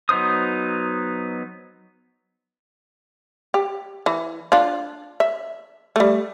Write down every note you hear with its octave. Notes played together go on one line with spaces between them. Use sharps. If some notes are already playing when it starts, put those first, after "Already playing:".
F#3 B3 D#4 C5 D#6
G4
E3
D4 F4
E5
G3 A3